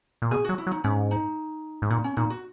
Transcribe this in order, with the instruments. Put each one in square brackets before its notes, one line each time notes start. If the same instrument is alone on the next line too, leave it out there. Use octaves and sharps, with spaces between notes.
[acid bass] A#2
[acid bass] B2 [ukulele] G#4
[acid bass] F#3 [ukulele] F#4
[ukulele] E4
[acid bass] F#3
[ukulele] D#4
[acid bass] G#2 [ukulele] C#4
[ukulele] D#4
[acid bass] G#2
[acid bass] A#2 [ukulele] D#4
[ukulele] C#4
[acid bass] A#2 [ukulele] D#4
[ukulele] F#4